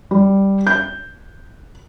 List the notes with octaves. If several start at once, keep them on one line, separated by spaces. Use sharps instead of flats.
G3
G6